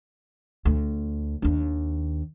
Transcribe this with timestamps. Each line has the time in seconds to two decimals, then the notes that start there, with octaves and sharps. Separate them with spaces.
0.65 D2
1.42 D#2 D4